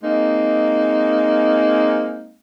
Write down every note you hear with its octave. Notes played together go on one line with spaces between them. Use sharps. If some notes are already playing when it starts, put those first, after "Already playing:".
G#3 A#3 C4 D#4